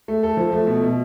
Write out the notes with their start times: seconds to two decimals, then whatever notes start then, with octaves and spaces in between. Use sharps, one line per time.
0.08 A3
0.23 A4
0.37 F3
0.52 A3
0.67 B2
0.83 B2